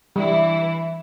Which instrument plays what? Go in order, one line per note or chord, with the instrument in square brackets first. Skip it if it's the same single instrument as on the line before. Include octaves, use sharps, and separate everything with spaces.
[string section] E3 E4 [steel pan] G3